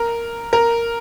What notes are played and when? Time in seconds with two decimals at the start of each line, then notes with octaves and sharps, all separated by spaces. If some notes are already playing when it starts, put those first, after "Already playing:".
Already playing: A#4
0.53 A#4